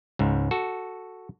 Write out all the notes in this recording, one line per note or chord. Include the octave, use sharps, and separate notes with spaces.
C#2 G#2
F#4 A4